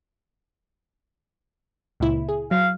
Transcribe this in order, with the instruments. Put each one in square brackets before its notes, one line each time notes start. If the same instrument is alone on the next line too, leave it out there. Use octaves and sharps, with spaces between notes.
[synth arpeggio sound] C#2 A#2 E4
G#4
[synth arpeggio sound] F#3 [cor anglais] F5